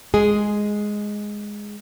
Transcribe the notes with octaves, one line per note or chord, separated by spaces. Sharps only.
G#3 G#4